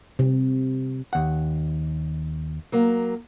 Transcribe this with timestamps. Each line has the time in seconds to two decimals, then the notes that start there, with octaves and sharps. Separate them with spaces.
0.19 C3
1.13 D#2 F#5
2.72 F#3 A#3